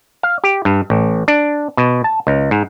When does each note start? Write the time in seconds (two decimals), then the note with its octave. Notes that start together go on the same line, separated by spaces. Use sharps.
0.23 F5
0.44 G4
0.65 G2
0.90 A1
1.28 D4
1.77 B2
2.04 A5
2.27 C#2
2.51 G#2